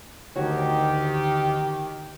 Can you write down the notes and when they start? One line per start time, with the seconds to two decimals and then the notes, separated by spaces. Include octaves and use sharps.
0.36 D2 D#3 F#4 G4 C#5